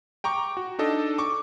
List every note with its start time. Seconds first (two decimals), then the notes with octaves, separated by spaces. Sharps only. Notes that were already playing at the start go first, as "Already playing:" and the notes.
0.24 G5 A#5 C#6 D6
0.57 F#4
0.79 D4 D#4 A4 D#5
1.18 C#6 D6